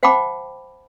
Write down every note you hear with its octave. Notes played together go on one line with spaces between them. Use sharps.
C5 F5 G5 A5 B5 D6